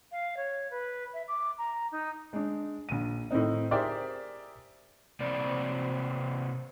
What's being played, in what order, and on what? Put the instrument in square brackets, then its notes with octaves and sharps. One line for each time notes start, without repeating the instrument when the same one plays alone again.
[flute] F5
C#5
B4
E5
D6
A#5
D#4
[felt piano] G#3 D4
A#1 D#7
A2 D#3 C4 D#4
G4 G#4 A#4 C5 D5 E5
[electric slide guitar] C3 A#3 C4 D5